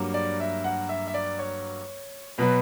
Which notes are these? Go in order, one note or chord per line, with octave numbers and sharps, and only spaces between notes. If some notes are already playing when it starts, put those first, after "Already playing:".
Already playing: G2 F#3 A#3
D5
E5
F#5
E5
E5
D5
C#5
B2 F#3 B3 B4